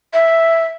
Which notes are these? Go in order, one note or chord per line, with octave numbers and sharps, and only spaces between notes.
E5